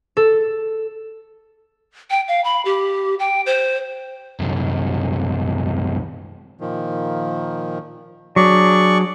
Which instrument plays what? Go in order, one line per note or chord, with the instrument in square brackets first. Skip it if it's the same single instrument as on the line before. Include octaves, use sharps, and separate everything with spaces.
[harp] A4
[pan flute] G5
F5
B5
G4
G5
C5
[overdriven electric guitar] C2 F#2
[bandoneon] A#2 D#3 F3
[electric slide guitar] F#3 [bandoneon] D4 G#4 [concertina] D5 C#6